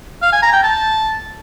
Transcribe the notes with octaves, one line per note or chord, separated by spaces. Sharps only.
F5
G#5
A#5
G5
A5